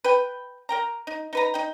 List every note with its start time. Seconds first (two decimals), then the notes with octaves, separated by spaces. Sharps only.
0.04 B4 G5
0.69 A#4 G5 A#5
1.07 D#4
1.33 D#4 B4 A#5
1.54 D#4 G5